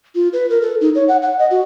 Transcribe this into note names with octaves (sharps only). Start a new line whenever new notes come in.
F4
B4
A#4
A4
D#4
C#5
F#5
F#5
D#5
F#4